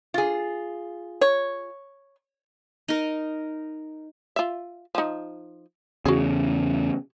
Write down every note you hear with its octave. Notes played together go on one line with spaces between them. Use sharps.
F4 G#4
C#5
D#4 A#4
F4 E5
F3 D#4
E2 C#3 F#4 G#4